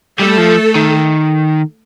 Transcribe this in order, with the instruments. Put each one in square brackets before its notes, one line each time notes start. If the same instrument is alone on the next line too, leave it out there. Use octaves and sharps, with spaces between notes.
[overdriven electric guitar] G3 [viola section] A3 A4
[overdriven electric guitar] F3
D#3